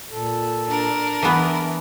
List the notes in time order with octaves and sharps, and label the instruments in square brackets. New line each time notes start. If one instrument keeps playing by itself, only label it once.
[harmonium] A#2 A4
[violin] D4 A#4
[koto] E3 B3 [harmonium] E5